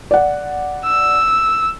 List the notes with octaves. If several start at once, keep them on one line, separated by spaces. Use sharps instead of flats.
D5 F#5
E6